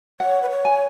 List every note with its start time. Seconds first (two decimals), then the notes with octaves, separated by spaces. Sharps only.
0.20 C#5 F#5
0.42 B4
0.50 C#5
0.65 G#5